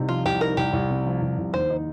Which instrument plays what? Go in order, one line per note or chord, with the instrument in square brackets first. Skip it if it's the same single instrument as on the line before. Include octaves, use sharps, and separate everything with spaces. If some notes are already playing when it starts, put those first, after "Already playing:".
Already playing: [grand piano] C2 C3 D#4
[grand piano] F3 [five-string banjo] F4
[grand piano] C2 [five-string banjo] G4
[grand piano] D#4 [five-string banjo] A#4
[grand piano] C2 [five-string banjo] G4
[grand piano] C2
C3
F3
C2
C2
[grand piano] D#2 [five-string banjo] C5
[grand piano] D#4